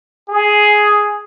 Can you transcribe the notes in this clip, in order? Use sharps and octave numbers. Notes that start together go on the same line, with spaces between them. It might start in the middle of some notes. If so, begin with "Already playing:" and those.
G#4